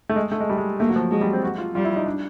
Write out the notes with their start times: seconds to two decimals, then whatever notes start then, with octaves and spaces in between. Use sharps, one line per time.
0.09 A3
0.16 G#3
0.32 A3
0.40 G#3
0.49 G3
0.58 G#3
0.80 A3 A#3
0.89 F#3
0.96 F3
1.11 F#3 G#3
1.21 G3
1.33 C4
1.43 F#4
1.58 F4
1.75 G3 F4
1.84 E4
1.96 D#4
2.06 D4